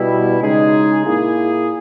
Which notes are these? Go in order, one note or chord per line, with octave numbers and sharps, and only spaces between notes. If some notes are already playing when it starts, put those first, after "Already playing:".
Already playing: B2 G3 B3 E4
C#3 G#3 D#4 G#4
A#2 A#3 E4 G#4